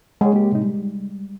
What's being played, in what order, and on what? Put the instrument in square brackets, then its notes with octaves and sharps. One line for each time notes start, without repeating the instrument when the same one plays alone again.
[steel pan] G#3 [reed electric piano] G#4 C#5
[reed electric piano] A#3 G4
A2 C3 D#4
G3